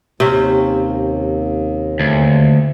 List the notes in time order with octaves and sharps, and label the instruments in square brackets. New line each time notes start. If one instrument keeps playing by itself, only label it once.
[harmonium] D#2 [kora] C3 C4 C#4
[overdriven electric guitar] D2